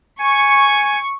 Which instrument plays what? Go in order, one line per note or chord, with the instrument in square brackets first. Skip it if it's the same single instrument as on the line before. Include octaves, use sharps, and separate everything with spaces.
[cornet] G#5 [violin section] C#6